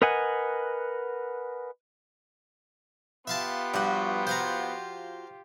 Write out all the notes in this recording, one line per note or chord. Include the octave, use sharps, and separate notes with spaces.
A#4 B4 D#5 F#5 G#5
B3 F4 G4 E5 F5 A5
G2 F3 F#4
C5 F5 A#5